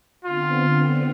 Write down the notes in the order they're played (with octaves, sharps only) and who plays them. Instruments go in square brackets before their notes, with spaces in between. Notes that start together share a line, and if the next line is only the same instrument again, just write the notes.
[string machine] D3 B3 C4 [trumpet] F4